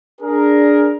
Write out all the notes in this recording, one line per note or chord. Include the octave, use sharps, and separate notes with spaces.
D4 G#4 A#4